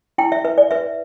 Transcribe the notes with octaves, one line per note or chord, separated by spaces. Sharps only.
E4 G5
E5
B4 E5
D5
B4 E5